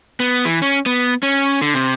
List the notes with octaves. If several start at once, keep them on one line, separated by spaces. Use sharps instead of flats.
B3
E3
C#4
B3
C#4
D3
C3